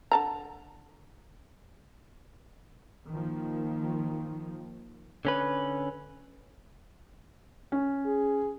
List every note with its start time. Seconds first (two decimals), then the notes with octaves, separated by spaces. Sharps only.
0.12 D3 A5 A#5
3.10 D#3 F3 A#3
5.25 D3 C#4 B4
7.72 C#4
8.06 G#4